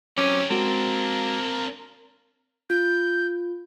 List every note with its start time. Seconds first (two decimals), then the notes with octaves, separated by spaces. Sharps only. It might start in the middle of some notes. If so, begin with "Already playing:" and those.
0.18 F#3 C4 C#4 G4 A#4 G#5 D6
0.51 G#3 A#3 C4 D4 F#4 A#4
2.70 F4 G6